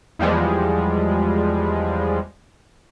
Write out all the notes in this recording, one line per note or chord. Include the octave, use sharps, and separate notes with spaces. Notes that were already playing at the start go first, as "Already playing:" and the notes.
E2 F3 G3 G#3